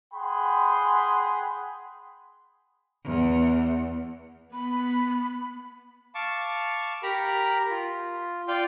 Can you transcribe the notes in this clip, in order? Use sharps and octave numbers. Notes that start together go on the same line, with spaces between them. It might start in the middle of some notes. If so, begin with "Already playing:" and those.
G#4 F#5 G5 B5 C6
E2
B3 B5
F5 A5 C#6 D6
G4 A#4 A#5 B5
F4
F4 D5 F5 G5